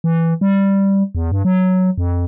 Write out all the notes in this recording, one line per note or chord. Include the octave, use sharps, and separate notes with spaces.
E3
G3
E2
G2
F#3
F2